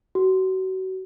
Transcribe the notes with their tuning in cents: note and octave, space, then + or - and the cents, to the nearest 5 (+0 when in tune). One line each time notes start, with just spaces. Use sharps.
F#4 +30